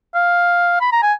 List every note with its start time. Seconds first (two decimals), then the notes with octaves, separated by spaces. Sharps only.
0.15 F5
0.81 B5
0.92 A#5
1.03 G#5